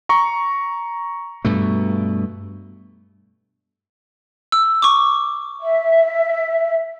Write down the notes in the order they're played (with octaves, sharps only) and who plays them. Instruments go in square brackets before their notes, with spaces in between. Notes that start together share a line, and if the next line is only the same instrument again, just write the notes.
[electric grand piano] A#5 C#6
[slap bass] G2 B2 A3
[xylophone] E6
C#6 D6
[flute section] E5